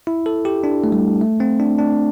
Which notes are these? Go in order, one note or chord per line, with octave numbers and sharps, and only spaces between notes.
E4
A4
G4
D4
A3
G3
A3
C4
D4
D4